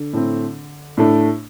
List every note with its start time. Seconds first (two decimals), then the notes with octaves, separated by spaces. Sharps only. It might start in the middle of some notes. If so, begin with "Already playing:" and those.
Already playing: D3
0.13 A2 A3 C4
0.97 A2 A3 D4